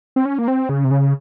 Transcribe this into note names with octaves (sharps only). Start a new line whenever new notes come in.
C4
C#4
A#3
C4
C#3
C3
C#3